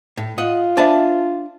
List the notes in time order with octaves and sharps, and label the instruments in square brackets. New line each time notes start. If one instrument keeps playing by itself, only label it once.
[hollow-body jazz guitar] A2
[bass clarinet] F4 [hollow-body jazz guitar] D#5 F#5
[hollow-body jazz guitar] D4 G#5 A5 [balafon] C5 E5